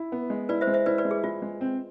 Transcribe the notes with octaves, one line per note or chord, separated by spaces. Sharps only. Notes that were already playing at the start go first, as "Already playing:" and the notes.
Already playing: E4
B3
G#3
E4 B4 D5
C5 E5
G#3
C5 E5
E4 B4 D5
B4 D5
G#3
G#4
G#3 F4
G#3
C4